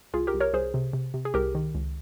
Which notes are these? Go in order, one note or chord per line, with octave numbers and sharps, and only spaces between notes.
C2 F4 G#4
G4 A#4
C2
A#4 C#5
C2 G#4 C5
C3
C3
C3
G#4
C2 G4 A#4
D#3
C#2